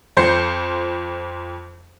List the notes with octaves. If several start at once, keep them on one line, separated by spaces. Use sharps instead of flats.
F2 F3 C5 G6 C7 C#7